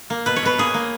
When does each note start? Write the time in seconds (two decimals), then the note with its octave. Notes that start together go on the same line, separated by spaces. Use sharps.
0.10 A#3
0.26 B2 B4
0.36 C#5
0.43 B2 B4
0.58 A#3 G#4
0.74 A#3